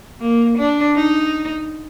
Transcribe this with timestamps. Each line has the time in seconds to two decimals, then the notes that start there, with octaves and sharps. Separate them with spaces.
0.20 A#3
0.58 D4
0.96 D#4